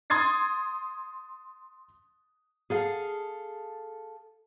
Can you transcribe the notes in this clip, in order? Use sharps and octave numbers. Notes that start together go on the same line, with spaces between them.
C6 D#6 G#6 A6 C7
G#4 A4 F5